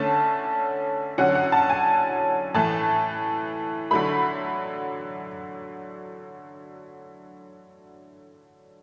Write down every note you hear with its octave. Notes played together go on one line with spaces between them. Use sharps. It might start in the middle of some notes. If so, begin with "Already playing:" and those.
Already playing: D3 A3 C#4 A5
D3 F#3 C#4 F#5
F#5
A5
G#5
A2 E3 A3 A5
D3 F#3 A3 B5